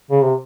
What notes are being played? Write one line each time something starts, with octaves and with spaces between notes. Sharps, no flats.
C#3
C3